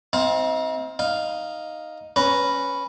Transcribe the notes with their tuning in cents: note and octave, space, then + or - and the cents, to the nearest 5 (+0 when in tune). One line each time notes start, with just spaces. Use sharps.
C4 +0 D#4 +40 F5 +10
D#4 +0 F5 +0
C#4 +0 B4 +0 A#5 +0